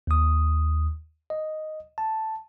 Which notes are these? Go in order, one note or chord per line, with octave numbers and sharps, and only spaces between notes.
D#2 D#6
D#5
A5